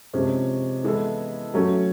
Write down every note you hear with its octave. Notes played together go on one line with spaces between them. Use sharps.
C3 F3 G#3 C#4
E3 G#3 B3 E4 A4
F#3 A3 C#4